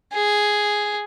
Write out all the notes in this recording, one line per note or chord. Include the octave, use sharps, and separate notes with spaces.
G#4